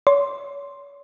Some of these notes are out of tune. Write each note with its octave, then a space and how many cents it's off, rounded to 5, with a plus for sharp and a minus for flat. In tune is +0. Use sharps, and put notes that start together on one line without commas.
C#5 +35 C6 +0